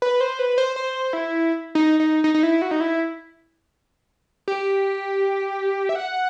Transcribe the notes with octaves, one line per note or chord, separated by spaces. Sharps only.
B4
C5
B4
C5
C5
E4
D#4
D#4
D#4
D#4
E4
F#4
D#4
E4
G4
E5
F#5